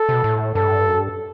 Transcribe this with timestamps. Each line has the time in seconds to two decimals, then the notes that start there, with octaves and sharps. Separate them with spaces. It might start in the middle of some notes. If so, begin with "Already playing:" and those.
Already playing: A4
0.09 C3
0.13 B2
0.24 A2
0.55 G2 A4
0.88 F#2
0.98 G2